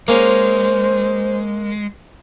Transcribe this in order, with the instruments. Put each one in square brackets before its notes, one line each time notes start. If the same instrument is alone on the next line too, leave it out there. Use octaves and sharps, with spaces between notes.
[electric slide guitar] G#3 [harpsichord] A#3 C#4 [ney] C5